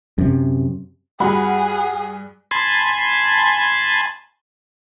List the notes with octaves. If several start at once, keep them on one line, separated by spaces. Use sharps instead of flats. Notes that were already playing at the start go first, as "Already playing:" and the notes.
F#2 C3
G2 F#4 G#4 F#5 B5
G#5 A5 B5 C6